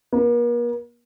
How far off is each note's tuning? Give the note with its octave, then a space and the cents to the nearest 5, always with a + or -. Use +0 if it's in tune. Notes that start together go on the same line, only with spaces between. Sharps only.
A#3 +45